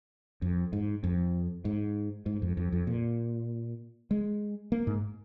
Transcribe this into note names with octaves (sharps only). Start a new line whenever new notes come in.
F2
G#2
F2
G#2
G#2
F2
F2
F2
A#2
G#3
A#3
G#2